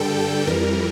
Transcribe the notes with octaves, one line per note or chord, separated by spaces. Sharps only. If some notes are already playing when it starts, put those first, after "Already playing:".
Already playing: G2 D3 G3 A4 G5
A4
F2 E3 G3 A#4